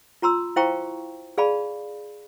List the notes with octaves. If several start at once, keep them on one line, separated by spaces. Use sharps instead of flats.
F4 A#5 C6 E6
E4 C5 F5 G5 A#5 C#6
G#4 D5 F5 A5 B5